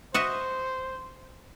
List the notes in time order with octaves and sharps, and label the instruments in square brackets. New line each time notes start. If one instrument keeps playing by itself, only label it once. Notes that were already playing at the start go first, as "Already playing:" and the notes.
[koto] F#4 D#5 E5 [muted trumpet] C5